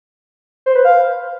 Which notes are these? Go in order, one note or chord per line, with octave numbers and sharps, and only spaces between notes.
C5
B4
F5